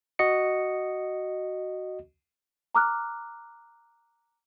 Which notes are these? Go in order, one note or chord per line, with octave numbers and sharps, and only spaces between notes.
F#4 D#5 C#7
A#5 D6 F6 F#6